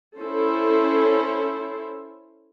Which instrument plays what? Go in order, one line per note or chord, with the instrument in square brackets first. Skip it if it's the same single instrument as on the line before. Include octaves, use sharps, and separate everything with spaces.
[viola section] C#4 E4 A4 C5